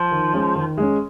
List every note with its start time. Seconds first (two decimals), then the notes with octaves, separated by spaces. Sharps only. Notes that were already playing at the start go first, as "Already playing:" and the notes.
Already playing: F3
0.11 D#3
0.34 G#3 C#4
0.56 D#3
0.77 G#3 C#4